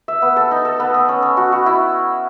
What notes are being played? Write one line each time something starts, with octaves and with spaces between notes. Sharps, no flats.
E5
B3
A4
D#4
A4
B3
B3
C#4
C#4
F#4
F#4
E4